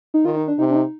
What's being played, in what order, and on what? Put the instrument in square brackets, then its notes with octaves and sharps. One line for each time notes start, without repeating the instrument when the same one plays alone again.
[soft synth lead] D#4
[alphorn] D#3 [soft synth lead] F4
[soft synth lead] D#4
D4
[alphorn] C3 [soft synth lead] D#4
[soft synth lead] D4
D#4